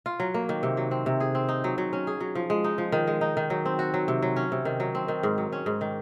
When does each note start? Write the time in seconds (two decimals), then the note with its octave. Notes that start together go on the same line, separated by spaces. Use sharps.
0.06 F4
0.20 F#3
0.34 A#3
0.49 D#3
0.63 C3
0.77 F#3
0.91 C4
1.06 C3
1.20 G#4
1.35 C4
1.49 D#4
1.64 F#3
1.78 F#3
1.93 C#4
2.07 G#4
2.21 F#3
2.35 F3
2.50 G#3
2.64 D#4
2.78 F3
2.92 D#3
3.07 G#3
3.21 D#4
3.37 D#3
3.50 F#3
3.66 C4
3.79 F#4
3.94 F#3
4.08 C3
4.22 F#3
4.36 C#4
4.52 C3
4.65 D#3
4.80 F#3
4.95 C4
5.08 D#3
5.23 G#2
5.38 F#3
5.52 C#4
5.66 G#2
5.81 D#3